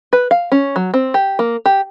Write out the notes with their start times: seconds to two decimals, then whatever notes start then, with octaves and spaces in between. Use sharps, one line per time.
0.13 B4
0.31 F5
0.52 C#4
0.76 F#3
0.94 C4
1.14 G4
1.39 A#3
1.66 G4